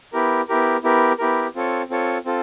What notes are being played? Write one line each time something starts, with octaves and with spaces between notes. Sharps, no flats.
B3 E4 G4 A#4
B3 E4 G4 A#4
B3 E4 G4 A#4
B3 E4 G4 A#4
C4 F4 A4 C#5
C4 F4 A4 C#5
C4 F4 A4